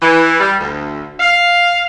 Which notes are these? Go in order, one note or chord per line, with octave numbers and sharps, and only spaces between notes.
E3
G3
D2
F5